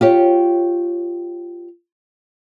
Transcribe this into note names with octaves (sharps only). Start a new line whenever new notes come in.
F4 G4 C#5